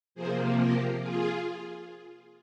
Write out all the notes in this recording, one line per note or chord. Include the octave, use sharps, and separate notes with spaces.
C3 F3 A#3 G#4 C5
G4 A#4
F4 G#4